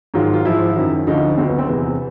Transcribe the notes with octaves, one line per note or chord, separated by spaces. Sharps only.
G#2 D#3 F#3 F4
F4
G#2 F3 E4
F#2 D#3 F#3
D2 D3 F3 D#4
D2 D3 F#3 C4
B3
C4
E2 C3 E3 B3